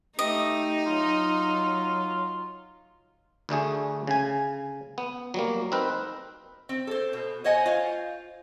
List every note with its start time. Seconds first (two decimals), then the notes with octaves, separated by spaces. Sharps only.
0.19 A3 D#4 G4 D#5
0.86 F#3 F4
3.49 D2 D3 A3 G#4
4.07 C#3 G#5
4.98 B3
5.34 F#3 G3 A#3
5.72 C4 D#4 A#4 B4
6.69 C4
6.87 A4 C5
7.13 B2
7.44 C5 C#5 D#5 F#5 G#5
7.66 F4 C5 C#5 F5